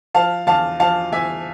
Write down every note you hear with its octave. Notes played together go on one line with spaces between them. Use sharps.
F3 F5 A5
E2 F5 A5
F3 F5 A5
E2 E5 G#5